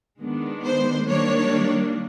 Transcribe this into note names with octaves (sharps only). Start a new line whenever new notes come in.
D#3 G#3 B3 D4
C5
D#3 G3 A#3 D4 C#5